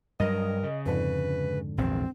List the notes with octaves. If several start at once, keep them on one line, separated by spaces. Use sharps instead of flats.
G2 F#3 A#4 D#5
C#3
F2 G#2 D3 B4
A#1 E2 C4